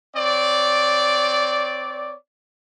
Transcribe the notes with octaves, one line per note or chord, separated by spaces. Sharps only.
C4 C#5 D5